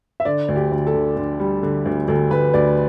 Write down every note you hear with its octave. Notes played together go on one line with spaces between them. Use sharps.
E5
D3 D5
D2
G4
D2
A4
D3
D3
G3
D3
D2
D2 A4
D2 B4
D2 D5